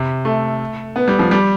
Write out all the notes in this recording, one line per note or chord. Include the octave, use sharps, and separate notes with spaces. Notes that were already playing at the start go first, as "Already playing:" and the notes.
Already playing: C3
A3
B3
G3
F3
G3